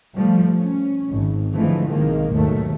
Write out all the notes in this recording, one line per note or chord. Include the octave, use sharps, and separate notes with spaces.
F3 G3 A3
C#4
G#1
D3 E3 F3 G#3 A3
B1 C3 D#3 G#3 A#3
D#2 G#2 B2 D#3 F#3 A3